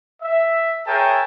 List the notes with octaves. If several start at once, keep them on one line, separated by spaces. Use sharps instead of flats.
E5
G#4 A#4 C#5 E5 G5 A5